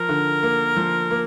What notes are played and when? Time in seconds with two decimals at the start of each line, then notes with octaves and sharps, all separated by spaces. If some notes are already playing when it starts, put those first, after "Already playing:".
Already playing: F3 A#4
0.09 D3
0.43 A#3
0.77 F3
1.11 A#3